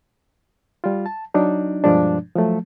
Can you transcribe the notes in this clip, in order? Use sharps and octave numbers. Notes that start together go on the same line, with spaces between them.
G3 F4
A5
F#3 D4 D#4
G2 B2 F3 G#3 D4
F3 F#3 A3